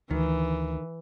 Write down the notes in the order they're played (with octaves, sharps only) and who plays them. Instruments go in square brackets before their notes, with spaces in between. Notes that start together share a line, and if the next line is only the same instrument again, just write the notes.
[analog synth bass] D2 [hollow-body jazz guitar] D#3 [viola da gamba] E3